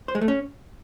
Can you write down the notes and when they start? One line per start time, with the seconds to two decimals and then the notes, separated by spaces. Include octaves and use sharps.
0.08 C5
0.15 G#3
0.21 A3
0.28 C#4